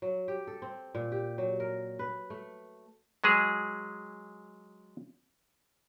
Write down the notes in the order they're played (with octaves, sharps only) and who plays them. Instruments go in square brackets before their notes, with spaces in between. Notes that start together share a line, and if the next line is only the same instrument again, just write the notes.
[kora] F#3
G4
A4
C4
A#2
G4
F#3
A#4
B4
A3
[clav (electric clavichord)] F#3 G#3 G#4